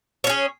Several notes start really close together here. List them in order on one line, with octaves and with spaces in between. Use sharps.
C#5 C#4 G#4